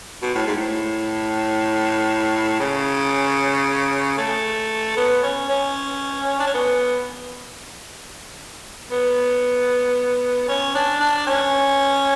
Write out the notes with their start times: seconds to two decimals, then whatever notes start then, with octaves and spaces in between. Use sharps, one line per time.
0.23 B2
0.34 A2
0.46 G#2
0.56 A2
2.60 C#3
4.17 A3
4.97 B3
5.23 C#4
5.49 C#4
6.40 D4
6.47 C#4
6.54 B3
8.91 B3
10.48 C#4
10.75 D4
11.00 D4
11.27 C#4